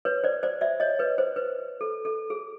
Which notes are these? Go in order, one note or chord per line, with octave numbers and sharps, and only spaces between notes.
B4 C#5
C5 D5
C5 D5
D5 E5
C#5 D#5
B4 C#5
C5
B4
A4
A4
G#4